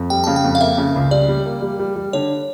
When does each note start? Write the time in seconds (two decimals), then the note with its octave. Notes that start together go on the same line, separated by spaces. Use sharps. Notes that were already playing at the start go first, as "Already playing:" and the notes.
Already playing: F2
0.10 G3 G5
0.24 C#3 A5
0.36 G5
0.44 F2
0.55 F5
0.61 A#3 E5
0.78 C#3
0.96 C#2
1.11 G3 D5
1.28 G3
1.46 A#3
1.62 G3
1.79 G3
1.96 G3
2.13 D3 C#5